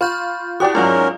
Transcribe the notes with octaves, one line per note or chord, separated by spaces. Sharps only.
F4 B5 C#6 G6
E4 F#4 G4 D5 D#6
G#2 F#3 C#4 F4 A#4 D5 F5